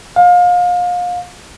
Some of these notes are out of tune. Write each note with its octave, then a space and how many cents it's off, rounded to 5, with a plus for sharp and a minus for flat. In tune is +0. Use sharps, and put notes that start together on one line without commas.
F5 +30